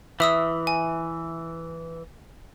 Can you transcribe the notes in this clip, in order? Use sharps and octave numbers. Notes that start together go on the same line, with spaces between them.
E3 E5 D#6 E6
G#5